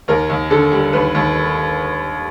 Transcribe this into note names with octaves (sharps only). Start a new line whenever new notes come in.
D#2 A#4
D#2
D3 A4
G3
D#2 B4
D#2